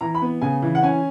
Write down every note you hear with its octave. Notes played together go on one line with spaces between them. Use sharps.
E3 A#5
B5
B3
C#3 G#5
E3
F#5
C#4 G#5